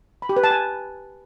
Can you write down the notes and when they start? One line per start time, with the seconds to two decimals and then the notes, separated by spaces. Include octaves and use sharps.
0.22 B5
0.29 G4
0.36 B4
0.44 A5
0.51 G#5